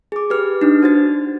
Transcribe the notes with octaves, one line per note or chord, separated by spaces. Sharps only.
G#4 D6
G4 B4 F6
D4 D#4
F#4 C5 A6